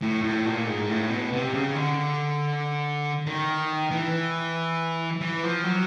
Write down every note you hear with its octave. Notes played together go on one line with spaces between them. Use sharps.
A2
A2
A#2
G#2
A2
B2
C3
C#3
D3
D#3
E3
E3
F3
F#3